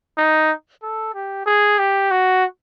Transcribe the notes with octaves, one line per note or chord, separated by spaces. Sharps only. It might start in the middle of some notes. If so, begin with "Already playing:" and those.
D#4
A4
G4
G#4
G4
F#4